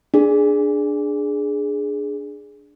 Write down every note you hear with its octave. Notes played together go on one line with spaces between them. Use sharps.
D4 G#4